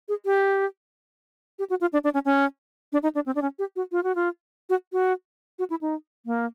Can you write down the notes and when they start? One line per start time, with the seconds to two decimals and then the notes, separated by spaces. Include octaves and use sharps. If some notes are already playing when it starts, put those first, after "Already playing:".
0.08 G#4
0.25 G4
1.59 G4
1.70 F#4
1.81 F4
1.93 D4
2.04 D4
2.14 C#4
2.25 C#4
2.92 D4
3.03 D#4
3.15 D4
3.26 C4
3.35 D4
3.42 C#4
3.59 G4
3.76 F#4
3.92 F4
4.03 F#4
4.15 F4
4.69 F#4
4.92 F#4
5.59 F#4
5.70 E4
5.81 D#4
6.26 A#3